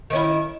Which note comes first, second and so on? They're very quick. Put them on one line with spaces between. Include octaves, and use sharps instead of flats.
D#3 C#4 E4